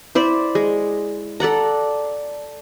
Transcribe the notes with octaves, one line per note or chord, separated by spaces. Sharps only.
E4 C5 D5 E5
G#3
A4 D5 F#5 A#5